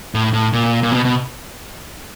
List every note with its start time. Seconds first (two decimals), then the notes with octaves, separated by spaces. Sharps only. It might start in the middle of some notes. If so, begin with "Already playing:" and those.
0.15 A2
0.33 A2
0.53 A#2
0.83 A#2
0.92 B2
1.05 B2